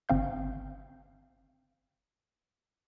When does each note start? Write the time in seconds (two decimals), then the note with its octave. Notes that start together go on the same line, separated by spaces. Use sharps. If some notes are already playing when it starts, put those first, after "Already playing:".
0.09 G1 C4 F5 G6